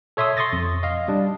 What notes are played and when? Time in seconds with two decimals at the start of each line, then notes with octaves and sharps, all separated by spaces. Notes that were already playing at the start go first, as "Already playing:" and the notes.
0.17 A4 C#5 E5 C6 D#6 E6
0.37 C6 C#6 D#6 A6 A#6
0.53 F2
0.83 D#5 F5
1.08 G3 D4